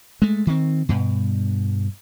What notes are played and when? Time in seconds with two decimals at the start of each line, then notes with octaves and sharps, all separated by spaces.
0.22 G#3 A3
0.47 D#3 C4
0.89 G2 B2